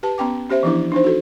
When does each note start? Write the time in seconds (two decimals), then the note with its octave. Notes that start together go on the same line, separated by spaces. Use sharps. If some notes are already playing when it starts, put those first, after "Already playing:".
0.03 G4 B4 A5
0.18 B3 C#4 G5 D6
0.49 C#4 G4 C5 E5
0.63 E3 F3 B3 D4 E4
0.92 D4 D#4 C5
1.04 F#4 A4